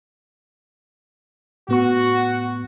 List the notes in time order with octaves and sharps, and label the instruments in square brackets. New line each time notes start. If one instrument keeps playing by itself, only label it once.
[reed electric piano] A2 B3 C#6 [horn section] F#4